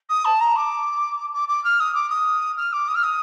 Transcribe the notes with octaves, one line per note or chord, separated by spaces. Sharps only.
D#6
A5
A#5
D6
D6
D6
F6
D#6
D6
D#6
F6
D6
D#6
F6
D#6